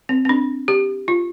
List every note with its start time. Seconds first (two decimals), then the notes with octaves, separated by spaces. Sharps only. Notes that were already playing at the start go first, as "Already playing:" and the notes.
0.09 C4
0.25 C4
0.29 D4
0.68 G4
1.08 F4